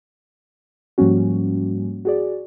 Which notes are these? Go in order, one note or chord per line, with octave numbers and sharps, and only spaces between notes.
G#2 F3 G3 A#3 C#4 F#4
F#4 G#4 D5